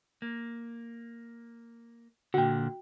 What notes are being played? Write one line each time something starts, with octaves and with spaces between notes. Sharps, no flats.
A#3
A#2 D3 F#4 G5